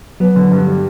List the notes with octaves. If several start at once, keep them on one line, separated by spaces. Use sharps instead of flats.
F#3 B3
D3
G2
G3